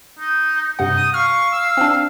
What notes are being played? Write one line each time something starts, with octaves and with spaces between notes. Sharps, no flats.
D#4
G2 C3 D#4 F#5
D#6
F5 C#6 F6
E6
C4 D4